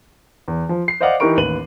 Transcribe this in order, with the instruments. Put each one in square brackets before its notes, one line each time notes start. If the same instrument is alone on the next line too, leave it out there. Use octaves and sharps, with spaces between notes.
[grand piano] E2
F3
C7
C5 D5 D#5 F5 F#5 D6
E3 D#4 G4 A#4 C#6 D7
A1 D#2 B4 D#7 F#7